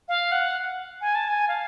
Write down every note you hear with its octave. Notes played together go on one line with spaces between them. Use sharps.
F5
F#5
G#5
A5
G#5
F5